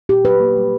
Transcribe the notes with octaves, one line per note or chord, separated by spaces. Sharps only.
A#2 G4
F#3 B4
A#3
G3